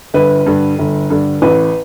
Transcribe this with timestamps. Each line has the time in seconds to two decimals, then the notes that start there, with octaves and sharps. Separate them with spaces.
0.14 G1 B4
0.46 G2 D3
0.79 G1
1.10 G2 D3
1.42 A1 B4